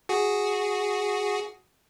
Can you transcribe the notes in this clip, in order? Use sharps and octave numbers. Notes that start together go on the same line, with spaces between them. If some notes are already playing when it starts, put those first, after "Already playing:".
F#4 G#4